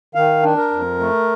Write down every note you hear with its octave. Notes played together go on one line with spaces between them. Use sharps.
D#3 F5
D4
A#4
F2
A3